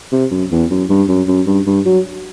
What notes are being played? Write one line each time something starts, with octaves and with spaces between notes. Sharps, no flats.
C3
F#2
E2
F#2
G2
F#2
F#2
G2
G2
F#3